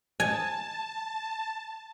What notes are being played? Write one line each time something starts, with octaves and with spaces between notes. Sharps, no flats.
G#5 A5